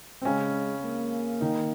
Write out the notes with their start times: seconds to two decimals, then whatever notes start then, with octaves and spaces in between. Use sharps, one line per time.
0.22 C4
0.25 C#3 G#3 C#4
0.84 A#3
1.41 D#3 D#4